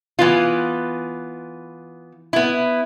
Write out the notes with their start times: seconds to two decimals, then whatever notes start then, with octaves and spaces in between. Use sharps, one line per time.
0.19 E3 B3 F4
2.33 B3 E4